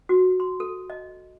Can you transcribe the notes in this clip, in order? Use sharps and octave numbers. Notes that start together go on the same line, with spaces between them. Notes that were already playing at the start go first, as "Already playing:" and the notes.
F#4
C6
A4
D#5